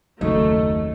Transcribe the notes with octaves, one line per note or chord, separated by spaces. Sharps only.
F#1 D#2 C#3 F#3 A3 D#4